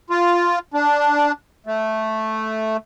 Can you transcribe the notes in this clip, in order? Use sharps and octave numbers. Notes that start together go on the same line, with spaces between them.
F4
D4
A3